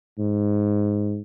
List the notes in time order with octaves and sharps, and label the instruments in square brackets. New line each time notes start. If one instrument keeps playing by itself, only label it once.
[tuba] G#2